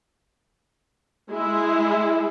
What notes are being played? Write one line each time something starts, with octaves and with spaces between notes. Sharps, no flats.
G#3 E4